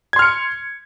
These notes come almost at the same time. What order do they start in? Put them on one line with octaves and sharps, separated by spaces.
G#6 C6 F6 C#7